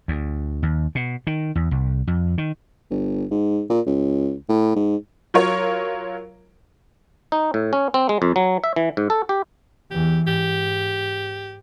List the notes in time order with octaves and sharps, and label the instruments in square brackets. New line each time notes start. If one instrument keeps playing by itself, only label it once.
[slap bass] D2
D#2
B2
D#3
E2
C2
F2
D#3
[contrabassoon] G1
G#2
A#2
C#2
A2
G#2
[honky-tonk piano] F#3 F4 A#4 C#5
[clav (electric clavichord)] D#4
A2
C#4
C4
G#3
F2
F#3
E5
E3
G#2
A4
G4
[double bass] E2 E3 [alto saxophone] G4
[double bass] G#2 [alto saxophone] G4